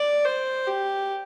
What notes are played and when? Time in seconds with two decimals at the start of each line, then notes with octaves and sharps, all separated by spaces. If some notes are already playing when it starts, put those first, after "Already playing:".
Already playing: D5
0.25 C5
0.67 G4